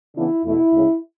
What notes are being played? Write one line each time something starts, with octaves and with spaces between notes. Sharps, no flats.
C#3 E3 B3 D4 E4
E2 B2 A3 E4
D2 C#3 G#3 C#4